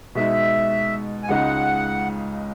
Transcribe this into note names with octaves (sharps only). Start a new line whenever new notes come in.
B2 G#3 D#4 E5
G#5
C#2 C#3 G#3 D#4 F#5